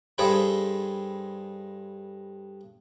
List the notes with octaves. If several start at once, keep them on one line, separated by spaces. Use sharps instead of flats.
G2 G#4 A4 C5 G5 B5